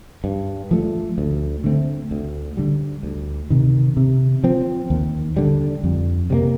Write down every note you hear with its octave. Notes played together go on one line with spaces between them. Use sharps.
G2
F3 A3
D2
D3 A3 C4
D2
D3 G3
D2
C3 D#3
C3
F3 C4
D#2
D3 G3
F2
C3 G3 A#3